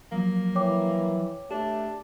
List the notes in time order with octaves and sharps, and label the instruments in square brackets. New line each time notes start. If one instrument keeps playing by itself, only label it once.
[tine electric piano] F3 F#3 [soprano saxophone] A#3
[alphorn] E3 [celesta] C#5 G5 D6
[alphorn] A3 [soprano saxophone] D4 [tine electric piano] G4